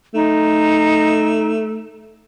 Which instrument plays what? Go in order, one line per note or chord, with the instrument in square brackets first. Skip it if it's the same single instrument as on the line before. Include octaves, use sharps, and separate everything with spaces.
[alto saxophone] A3 [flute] D#4